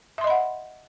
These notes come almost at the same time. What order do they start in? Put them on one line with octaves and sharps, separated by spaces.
E5 C6 D#5 B5 F#5